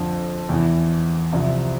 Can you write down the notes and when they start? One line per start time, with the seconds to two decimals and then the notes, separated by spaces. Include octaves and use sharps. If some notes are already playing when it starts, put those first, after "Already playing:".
Already playing: F2 D3 F3
0.49 E2 E3
1.33 C2 C3 F3